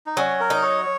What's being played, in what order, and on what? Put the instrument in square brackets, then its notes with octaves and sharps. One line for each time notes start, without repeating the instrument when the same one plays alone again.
[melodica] D#4
[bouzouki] F#3 [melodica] C#4
[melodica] A#4
[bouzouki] D#4
[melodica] C#5